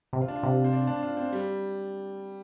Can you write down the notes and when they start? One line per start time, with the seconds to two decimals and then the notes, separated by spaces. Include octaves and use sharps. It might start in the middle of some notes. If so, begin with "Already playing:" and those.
0.13 C3
0.21 F4
0.28 D4
0.36 F4
0.43 C3
0.64 C4
0.73 D4
0.87 D4
1.02 F4
1.17 C4
1.33 G3